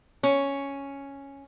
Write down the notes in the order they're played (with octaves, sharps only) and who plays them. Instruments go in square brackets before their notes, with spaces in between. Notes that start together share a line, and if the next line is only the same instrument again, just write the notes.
[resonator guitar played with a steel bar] C#4